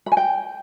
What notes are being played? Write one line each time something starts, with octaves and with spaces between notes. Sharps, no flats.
B5
G#5
G5